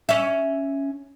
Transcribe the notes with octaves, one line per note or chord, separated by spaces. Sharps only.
C#4 E5